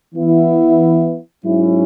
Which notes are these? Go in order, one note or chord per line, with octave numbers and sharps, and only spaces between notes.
E3 B3 E4
G#2 F#3 C#4 E4